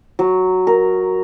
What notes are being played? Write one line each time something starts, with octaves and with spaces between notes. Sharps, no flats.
F#3
A#4